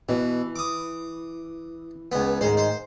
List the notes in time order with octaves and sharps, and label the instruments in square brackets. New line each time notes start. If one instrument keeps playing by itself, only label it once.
[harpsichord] B2 [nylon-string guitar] E3
[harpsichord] D6 D#6
C#2 B3
[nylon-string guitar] G#2 D#3 G#3 [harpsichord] C5
[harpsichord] C5